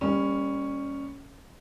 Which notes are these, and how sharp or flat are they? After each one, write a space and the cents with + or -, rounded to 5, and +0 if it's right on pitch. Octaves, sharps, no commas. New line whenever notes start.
G3 +30 A#3 +0 C#4 +0